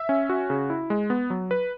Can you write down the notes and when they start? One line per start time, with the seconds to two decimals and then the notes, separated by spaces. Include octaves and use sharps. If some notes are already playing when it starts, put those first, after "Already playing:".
Already playing: E5
0.09 C#4
0.29 F#4
0.50 C#3
0.70 E4
0.90 G#3
1.10 B3
1.30 F#3
1.51 B4